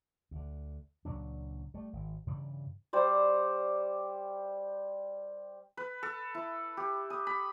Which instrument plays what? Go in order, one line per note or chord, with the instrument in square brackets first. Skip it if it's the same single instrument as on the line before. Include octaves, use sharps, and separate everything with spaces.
[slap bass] D2 D3
C#2 A#2 F#3 D4
G3 A3
G#1
G2 C#3 E3 G3
[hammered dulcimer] G3 C5 D5
[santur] B4
A4
E4
G4
D#6
B5